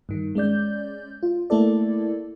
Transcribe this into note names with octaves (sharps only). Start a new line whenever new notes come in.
G2 D#3
G#3 C#4 D5 G6
F4
A3 A#3 E4 A4 D5